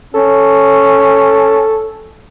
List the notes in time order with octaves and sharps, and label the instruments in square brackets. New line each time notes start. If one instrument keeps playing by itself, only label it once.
[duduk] C#4 [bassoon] A4